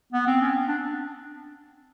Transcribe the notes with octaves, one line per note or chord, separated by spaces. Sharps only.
B3
C4
C#4
D4